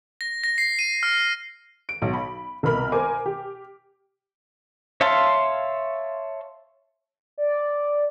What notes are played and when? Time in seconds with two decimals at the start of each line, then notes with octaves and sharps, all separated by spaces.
0.21 A#6
0.44 A#6
0.58 C7
0.79 D#7
1.03 F6
1.89 D7
2.02 B1
2.13 B5
2.63 C2 B2 A#4 B5 F6
2.92 A#4 C5 G#5 D6
3.26 G4
5.01 C#5 E5 F5 A5 C6
7.38 D5